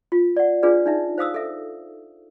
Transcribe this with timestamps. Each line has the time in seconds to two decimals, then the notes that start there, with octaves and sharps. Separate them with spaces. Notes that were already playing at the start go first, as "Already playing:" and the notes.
0.12 F4
0.37 D5 F#5
0.63 D4 F4 G#4 B4 D5
0.86 D4 D#4 E5
1.18 C5 F5 D#6 E6
1.34 A4 E5